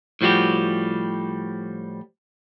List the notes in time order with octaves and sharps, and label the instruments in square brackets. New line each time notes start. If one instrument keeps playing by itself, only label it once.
[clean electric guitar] A2 F3 G3 F#4 G4